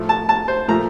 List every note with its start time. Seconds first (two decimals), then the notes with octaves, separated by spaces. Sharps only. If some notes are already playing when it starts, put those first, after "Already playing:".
Already playing: A2 F3 A3
0.09 A5
0.29 A5
0.48 C5
0.68 A#2 F3 A3 A#5